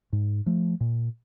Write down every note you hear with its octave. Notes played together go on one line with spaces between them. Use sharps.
G#2
F3 A3
A#2